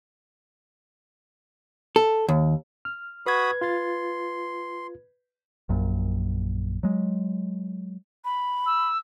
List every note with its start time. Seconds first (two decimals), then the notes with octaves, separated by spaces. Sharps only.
1.96 A4
2.29 D#2
2.85 F6
3.26 F#4 B4 B5 D#6 G#6
3.61 F4 C6 A6
5.69 A#1 F#2 A#2
6.83 F#3 G#3
8.25 B5
8.66 E6